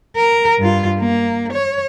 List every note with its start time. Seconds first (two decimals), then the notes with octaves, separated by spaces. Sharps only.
0.16 A#4
0.59 G2 F4
0.99 A#3
1.52 C#5